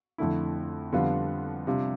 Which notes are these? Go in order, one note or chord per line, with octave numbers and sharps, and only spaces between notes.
F2 D3 A3 E4
F2 D3 G3 B3 F4
C3 G3 D4 F4